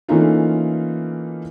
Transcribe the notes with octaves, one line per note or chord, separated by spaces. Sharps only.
E3 A3 A#3 C#4 D#4 F4